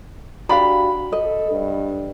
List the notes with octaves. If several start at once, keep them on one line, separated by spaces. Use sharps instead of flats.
D4 F#4 G4 F5 B5
A4 D#5
G2